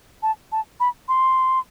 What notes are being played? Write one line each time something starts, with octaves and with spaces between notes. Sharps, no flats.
A5
A5
B5
C6